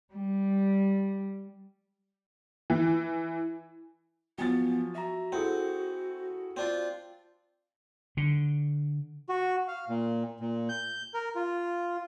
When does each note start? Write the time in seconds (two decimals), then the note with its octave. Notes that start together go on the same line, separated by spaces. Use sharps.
0.12 G3
2.70 E3
4.38 F3 F#3 B3 G#5 A6
4.95 F#4 E5 A#5
5.32 C4 E4 G#4 A4 F#5
6.57 C4 D4 F4
8.17 D3
9.29 F#4
9.68 F5
9.89 A#2
10.40 A#2
10.69 G6
11.14 A#4
11.36 F4